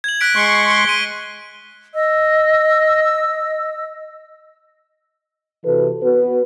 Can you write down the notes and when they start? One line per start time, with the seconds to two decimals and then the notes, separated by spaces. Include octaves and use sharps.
0.04 G#6 F#7
0.21 F#6 B6 D7
0.36 G#3 C6 C#6
0.70 F#6 D7 G7
0.88 B6 D#7
1.94 D#5 E6
5.65 C3 E3 F#4 A4 B4
6.03 B3 F#4 B4